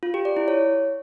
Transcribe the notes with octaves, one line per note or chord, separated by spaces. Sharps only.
F4
G4
D5
E4
C#5